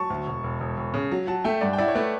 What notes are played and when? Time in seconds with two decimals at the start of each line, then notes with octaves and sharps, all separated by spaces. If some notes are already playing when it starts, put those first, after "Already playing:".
Already playing: F#3 A5 C#6
0.10 D2
0.26 E1
0.44 E1
0.60 E1
0.77 E1
0.94 C#3
1.11 F#3
1.27 F#3 F#5 A5
1.44 A3 E5 G5
1.61 G2 D5 F#5
1.73 G5
1.78 E4 D5 F#5
1.88 C#5
1.95 A3 B4 D5